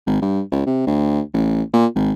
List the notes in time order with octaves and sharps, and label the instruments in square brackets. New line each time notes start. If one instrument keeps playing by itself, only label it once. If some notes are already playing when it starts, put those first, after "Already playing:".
[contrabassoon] G#1
G2
C#2
C3
D2
A1
A#2
G#1